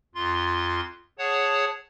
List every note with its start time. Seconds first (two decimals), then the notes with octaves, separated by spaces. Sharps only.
0.15 F2 F4 C6
1.19 G#4 C#5 F#5 A5